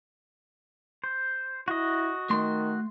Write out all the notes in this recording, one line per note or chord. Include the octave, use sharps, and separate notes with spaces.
C5
E4 F#4 D#5
D#3 A3 C6